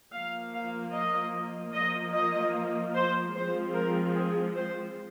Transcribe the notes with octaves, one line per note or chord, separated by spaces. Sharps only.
F3 A#3 F5
F5
D#5
F3 A#3 D#5
D#5
C5
F3 G#3 C4 C5
A#4
G#4
C5